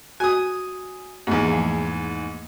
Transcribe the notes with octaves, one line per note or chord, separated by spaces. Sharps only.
F#4 G#5 D#6
E2 G#2 A#3
F3 A3